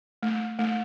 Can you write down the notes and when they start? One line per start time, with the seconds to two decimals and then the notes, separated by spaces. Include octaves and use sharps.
0.23 A3
0.59 A3